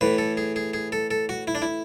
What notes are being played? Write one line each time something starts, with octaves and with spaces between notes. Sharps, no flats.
A2 E3 B4
A4
G#4
G#4
G#4
A4
A4
F#4
E4
D4
E4